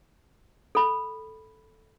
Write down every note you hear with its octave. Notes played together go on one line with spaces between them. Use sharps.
A4 B5